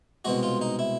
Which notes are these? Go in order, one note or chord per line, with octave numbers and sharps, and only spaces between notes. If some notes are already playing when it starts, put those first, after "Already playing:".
C2 B2 G#3 F#4
F4
D#4
E4